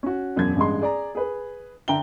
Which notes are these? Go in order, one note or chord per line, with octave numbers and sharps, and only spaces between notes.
C#4 F#4
E1 F#2 F#3 G#6
A1 G2 G#3 C6
G#4 D5 A#5
G#4 B4
D3 E5 G5 A#5 G7